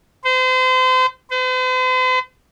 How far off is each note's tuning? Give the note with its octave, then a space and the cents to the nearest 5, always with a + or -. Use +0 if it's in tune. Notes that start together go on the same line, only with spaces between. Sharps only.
C5 -35
C5 -45